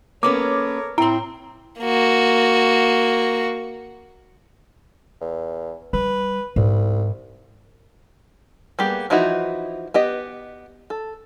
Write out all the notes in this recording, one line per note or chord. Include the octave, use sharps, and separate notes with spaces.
A#3 B3 C#4 A4 A#4 C#5 D6
A2 C4 E4 G5 A#5 C6
A#3 F#4
E2
G3 B4
C2 G#2
G3 A#3 B3 G4 G#4
E3 F3 D#4 E4 F#4
B3 G4 D#5
A4